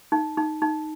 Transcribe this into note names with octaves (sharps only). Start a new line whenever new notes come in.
D#4
D#4
D#4